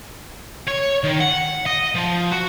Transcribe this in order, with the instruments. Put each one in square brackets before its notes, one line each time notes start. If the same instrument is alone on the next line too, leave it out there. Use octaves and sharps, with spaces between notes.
[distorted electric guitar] C#5
D#3
F#5
D#5
F3
F#4